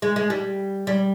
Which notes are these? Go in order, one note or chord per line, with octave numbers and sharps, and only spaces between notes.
G#3
G#3
G3
G3